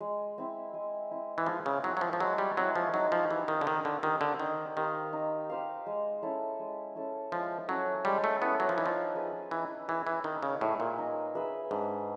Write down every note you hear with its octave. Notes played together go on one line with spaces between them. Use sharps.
G#3
C4 E4
G#3
C4 E4
E3
F3 G#3
C#3
F#3 C4 E4
F#3
F3
F3
F#3 G#3
G3
F#3 C4 E4
F3
F#3 D#4
F3
E3 G4 C5 F5
D#3
D3
D#3 D#4
D3
D#3 G4 C5 F5
D3
D#3 D#4
D#3 G4 C5 F5
D#4
G4 C5 F5
G#3
C#4 E4 A4
G#3
C#4 E4 A4
F3 G#3
F#3 C#4 E4 A4
G3 G#3
A3
B3 C#4 E4 A4
F#3
F3
E3 D#4
F3
G#4 B4 E5
E3 D#4
E3 G#4 B4 E5
E3
D#3 D#4
C#3
A2 G#4 B4 E5
A#2
D#4
G#4 B4 E5
G#2 D4